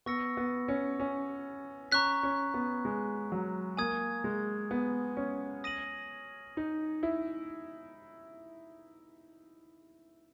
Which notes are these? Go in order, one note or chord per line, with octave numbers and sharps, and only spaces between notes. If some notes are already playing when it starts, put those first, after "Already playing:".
B3 C#6 E6 A#6 C#7
B3
C#4
C#4
C#4 A#5 C#6 F#6 B6
C#4
B3
G#3
F#3
A#3 G#5 D#6 G#6
G#3
B3
C#4
D#6 A#6 D#7 F#7
D#4
E4